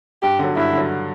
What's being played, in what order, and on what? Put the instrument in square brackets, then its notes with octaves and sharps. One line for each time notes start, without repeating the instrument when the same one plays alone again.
[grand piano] G2 [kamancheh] G4
[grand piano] D3 F#3
[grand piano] G2 [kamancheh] E4
[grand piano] D3 F#3